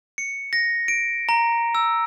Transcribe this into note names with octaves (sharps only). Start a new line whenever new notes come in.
C#7
A#6
D7
A#5
E6